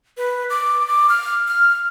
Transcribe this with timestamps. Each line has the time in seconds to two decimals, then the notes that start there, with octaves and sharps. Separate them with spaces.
0.17 B4
0.50 D6
0.87 D6
1.09 F6
1.48 F6